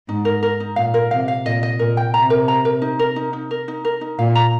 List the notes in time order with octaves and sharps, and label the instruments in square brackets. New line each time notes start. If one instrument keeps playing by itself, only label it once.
[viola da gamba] G#2 [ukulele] D#4
[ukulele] A#4
A#4
D#4
[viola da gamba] A#2 [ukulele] F5
[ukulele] A#4
[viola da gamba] C3 [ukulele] F5
[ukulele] F5
[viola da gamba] A#2 [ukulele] D#5
[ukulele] D#5
[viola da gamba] A#2 [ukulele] A#4
[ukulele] G5
[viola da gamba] C3 [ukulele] A#5
[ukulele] A#4
A#5
A#4
D#4
A#4
D#4
D#4
A#4
D#4
A#4
D#4
[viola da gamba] A#2 [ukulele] F5
[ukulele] A#5